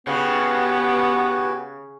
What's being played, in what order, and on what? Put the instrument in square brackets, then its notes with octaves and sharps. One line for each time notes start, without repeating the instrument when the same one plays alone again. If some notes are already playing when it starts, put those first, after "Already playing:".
[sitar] C#3 [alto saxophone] B3 [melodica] F#4 B4 G#5 [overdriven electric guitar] G4 F#5